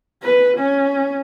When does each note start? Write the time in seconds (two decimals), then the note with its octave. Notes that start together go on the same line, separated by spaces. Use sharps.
0.22 B4
0.58 C#4